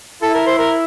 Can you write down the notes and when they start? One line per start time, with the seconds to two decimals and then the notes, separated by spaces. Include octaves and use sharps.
0.22 E4 A4
0.34 A#4
0.47 C5
0.58 A#4